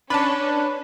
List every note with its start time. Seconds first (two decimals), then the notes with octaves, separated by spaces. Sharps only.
0.10 C#4 D4 B4 A5 B5